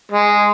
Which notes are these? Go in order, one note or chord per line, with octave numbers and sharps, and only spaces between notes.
G#3